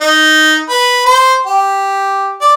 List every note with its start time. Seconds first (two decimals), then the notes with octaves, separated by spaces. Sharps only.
0.01 D#4
0.70 B4
1.06 C5
1.46 G4
2.41 D5